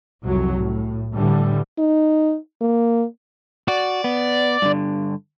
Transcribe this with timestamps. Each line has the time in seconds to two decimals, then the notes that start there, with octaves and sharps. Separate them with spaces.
0.22 C2 F2 F#3
0.54 A2
1.15 A2 D3 E3 G3
1.78 D#4
2.61 A#3
3.68 F#4 D5
4.04 B3
4.62 G2 D3